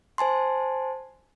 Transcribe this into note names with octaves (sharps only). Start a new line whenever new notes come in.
C5 G#5 A5 C6